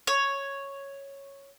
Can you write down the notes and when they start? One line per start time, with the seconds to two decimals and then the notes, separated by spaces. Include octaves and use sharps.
0.07 C#5